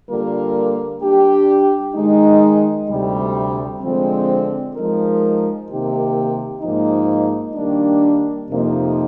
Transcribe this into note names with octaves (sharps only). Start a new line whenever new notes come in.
D3 G3 A#3 F4 A#4
G3 D4 G4
D#3 G#3 D#4
D2 C3 G3
D3 F3 G#3 C4
F3 G#3 D#4 A#4
C3 D#3 A#3 D#4 G4
G#2 F3 A#3 D#4
D#3 G3 A#3 D4
F2 C3 F3 A#3 D#4